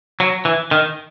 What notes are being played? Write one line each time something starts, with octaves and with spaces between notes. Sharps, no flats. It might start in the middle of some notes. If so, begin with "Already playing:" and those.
F#3
E3
D#3